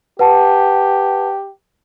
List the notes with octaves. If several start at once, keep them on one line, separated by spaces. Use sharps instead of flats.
G4 B4 F#5 A5